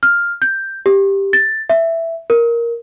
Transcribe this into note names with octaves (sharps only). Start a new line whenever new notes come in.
F6
G6
G4
A6
E5
A#4